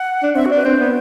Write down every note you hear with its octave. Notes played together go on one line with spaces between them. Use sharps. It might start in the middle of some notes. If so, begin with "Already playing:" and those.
Already playing: F#5
D4
C4 E5
F#4
D4 B4
C4 C5
B3